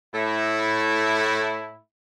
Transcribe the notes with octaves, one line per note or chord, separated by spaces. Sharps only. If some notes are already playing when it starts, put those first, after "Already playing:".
A2 A3 E4